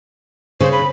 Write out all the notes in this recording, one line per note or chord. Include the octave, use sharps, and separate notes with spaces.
C#3 C5
B5